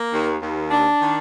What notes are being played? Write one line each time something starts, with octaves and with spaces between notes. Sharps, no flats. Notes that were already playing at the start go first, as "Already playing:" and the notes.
Already playing: A#3
D#2
D#2
D4
D#3